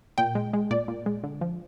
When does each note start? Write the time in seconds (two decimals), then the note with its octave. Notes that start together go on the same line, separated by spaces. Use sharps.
0.18 A#2 G5
0.35 G#3
0.53 G#3
0.71 A#2 D5
0.88 A#2
1.06 G#3
1.24 D3
1.41 F3